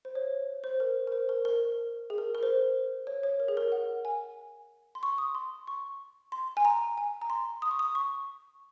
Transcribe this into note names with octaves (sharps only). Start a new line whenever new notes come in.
C5
C#5
C5
A#4
A#4
C5
A#4
A#4
G#4
A#4
A#4
C5
C#5
C#5
A#4
G#4
A#4
F#5
G#5
C6
C#6
D#6
C6
C#6
C6
G#5
A#5
G#5
A#5
C6
D#6
C#6
D#6
C#6